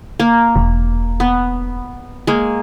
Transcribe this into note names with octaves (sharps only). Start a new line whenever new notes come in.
A#3
E1
B3
G#3 A#3